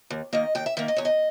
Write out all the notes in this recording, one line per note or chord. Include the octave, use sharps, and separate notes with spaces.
D#2
D#3 A#3 D#5
D#2 G5
E5
D#3 A#3 E5
D#5
E2 C#5
D#5